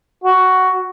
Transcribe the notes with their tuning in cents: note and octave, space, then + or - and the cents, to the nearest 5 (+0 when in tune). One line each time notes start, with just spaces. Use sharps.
F#4 +5